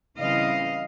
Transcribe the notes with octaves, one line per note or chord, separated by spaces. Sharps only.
C#3 E3 G3 C4 D#5 F5